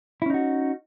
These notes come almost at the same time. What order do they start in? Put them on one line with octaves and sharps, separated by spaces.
E4 C#4 D#4 F#4